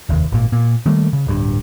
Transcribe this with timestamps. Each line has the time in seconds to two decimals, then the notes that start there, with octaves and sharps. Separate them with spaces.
0.09 F1 D#2
0.32 G#1 A#2
0.52 A#2
0.86 D#3 G3 A3 A#3
1.13 C#3
1.27 D1 G2